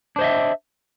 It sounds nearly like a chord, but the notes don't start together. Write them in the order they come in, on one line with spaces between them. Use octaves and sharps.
D4 C5 D#5 E5